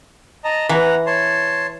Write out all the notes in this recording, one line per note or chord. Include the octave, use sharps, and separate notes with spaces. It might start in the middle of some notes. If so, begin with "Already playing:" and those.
D#5 A5 A#5
E3 F#5 A#5
C#5 A5 C6